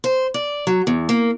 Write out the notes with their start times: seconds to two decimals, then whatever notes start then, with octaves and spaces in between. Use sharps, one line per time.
0.04 C5
0.34 D5
0.67 F#3
0.87 E2
1.09 A#3